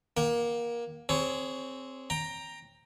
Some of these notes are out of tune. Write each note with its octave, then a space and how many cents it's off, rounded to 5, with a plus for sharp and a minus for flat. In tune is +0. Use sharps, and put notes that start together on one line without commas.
A#3 +20 G5 -40
C4 +0 G#4 +0 C#5 +20
G5 +15 A#5 +0